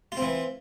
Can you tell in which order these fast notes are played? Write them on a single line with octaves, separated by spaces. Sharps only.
F4 C4 E3